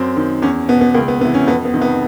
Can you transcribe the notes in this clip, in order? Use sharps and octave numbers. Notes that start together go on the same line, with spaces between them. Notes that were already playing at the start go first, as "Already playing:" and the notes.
Already playing: F#2 C4
D#3
E2 C#4
B2 B3
B3
C#2 A#3
B3
C3 E3 B3
C#4
F2 B3
B3
C3 D#3
B3